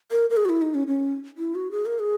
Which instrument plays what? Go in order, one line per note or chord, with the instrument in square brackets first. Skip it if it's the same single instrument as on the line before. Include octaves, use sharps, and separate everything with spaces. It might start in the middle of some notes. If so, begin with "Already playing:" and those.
[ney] A#4
A#4
G#4
F#4
E4
D#4
C#4
C#4
E4
F#4
G#4
A#4
G#4